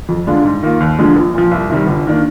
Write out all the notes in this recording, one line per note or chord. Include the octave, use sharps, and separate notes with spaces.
F2
D3 G#3 D4 F4
G#2
D#3 A#3 F4
D#2
D3 F3 G#3 D4
A#1
A#2 F3
C2
C3 D#3 G3
G1
D#3 A#3 D4